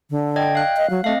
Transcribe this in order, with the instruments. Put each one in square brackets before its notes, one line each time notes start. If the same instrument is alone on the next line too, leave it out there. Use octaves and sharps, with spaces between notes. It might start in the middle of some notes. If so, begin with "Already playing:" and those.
[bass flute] D3
[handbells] D5 D#5 G#6 [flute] G5
[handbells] F5 F#6
[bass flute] D#5
F#3
[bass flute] A3 [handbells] C4 D#5 F5